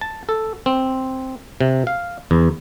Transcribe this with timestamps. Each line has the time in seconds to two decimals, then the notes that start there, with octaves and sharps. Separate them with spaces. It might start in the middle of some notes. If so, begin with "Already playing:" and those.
0.01 A5
0.29 A4
0.66 C4
1.61 C3
1.87 F5
2.31 E2